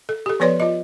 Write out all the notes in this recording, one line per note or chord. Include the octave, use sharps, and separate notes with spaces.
A4
G4 A4
F3 B3 B4 C#5 D5 C6
F4 D#5